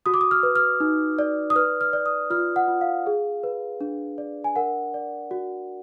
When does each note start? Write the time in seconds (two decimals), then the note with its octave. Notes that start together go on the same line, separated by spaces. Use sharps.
0.06 F#4 D#6
0.14 D6
0.21 D#6
0.31 F6
0.43 B4
0.56 F6
0.80 D#4
1.19 D5
1.50 D#6
1.56 B4 F6
1.81 F6
1.93 D5
2.06 D#6
2.30 F4 F6
2.56 F#5
2.68 F4
2.81 F5
3.07 G#4
3.43 B4
3.81 D4
4.18 D5
4.44 G#5
4.56 A#4 F#5
4.94 D5
5.31 F#4